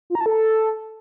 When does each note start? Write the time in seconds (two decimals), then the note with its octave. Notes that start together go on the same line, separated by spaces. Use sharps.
0.10 F4
0.15 A#5
0.21 A5
0.26 A4